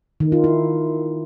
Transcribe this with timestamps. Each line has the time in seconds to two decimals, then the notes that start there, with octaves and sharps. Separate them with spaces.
0.20 D#3
0.32 F4
0.44 E4